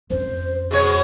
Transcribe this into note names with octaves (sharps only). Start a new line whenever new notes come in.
F2 C#4 C5
B2 G#3 G#4 C#5